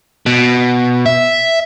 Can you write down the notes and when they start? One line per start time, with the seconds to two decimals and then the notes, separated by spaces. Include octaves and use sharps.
0.26 B2
1.06 E5